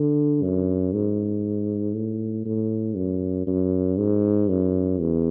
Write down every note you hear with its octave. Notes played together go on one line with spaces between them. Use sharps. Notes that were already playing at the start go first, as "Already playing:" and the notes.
Already playing: D3
F#2
G#2
A2
A2
F#2
F#2
G#2
F#2
E2